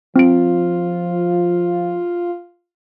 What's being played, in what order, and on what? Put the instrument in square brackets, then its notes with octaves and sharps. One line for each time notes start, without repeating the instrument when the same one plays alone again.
[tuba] F3 [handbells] C4 D7 [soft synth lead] F4